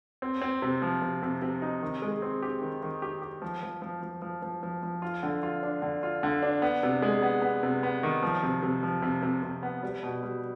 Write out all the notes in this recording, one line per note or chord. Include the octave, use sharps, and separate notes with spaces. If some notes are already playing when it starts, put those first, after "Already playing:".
C4
C4
C3
F3
C3
C3
C3
D#4
D#3
G#3
C4
G4
D#3
D#3
G4
G4
F3
F3
F3
F3
F3
F3
F3
F3
F4
D3
F4
D4
D3
F4
D3
D4
B3
C3
G#3
B3
B3
C3
B3
D#3
F3
C3
C3
F3
C3
C3
C3
B3
G3
B2
G3